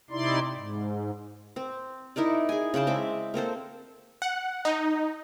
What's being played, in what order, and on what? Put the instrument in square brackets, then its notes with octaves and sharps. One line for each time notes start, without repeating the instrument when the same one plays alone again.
[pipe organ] C3 D#4 E4 D5 C6
G#2
[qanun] C4
D#4 E4 A#4 D5
G#4 G#5
C#3 F#5 G5 A5
G#3 C4 E5 D6
A#3 C4 A4 C5
[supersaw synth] F#5
D#4